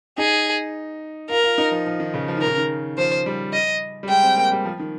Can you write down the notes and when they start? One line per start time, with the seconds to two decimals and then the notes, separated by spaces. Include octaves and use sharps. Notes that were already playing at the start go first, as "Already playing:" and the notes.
0.18 D#4 G#4
1.30 F4 A#4
1.44 F4
1.58 D#4
1.71 F3
1.86 F3
2.00 D#3
2.14 C#3
2.28 F3
2.37 D#3 A#4
2.47 C#3
2.58 D#3
2.98 F3 C5
3.26 G3
3.53 D#5
4.03 G3
4.09 G#3 G5
4.23 C4
4.37 A#3
4.52 G3
4.65 F3
4.79 D#3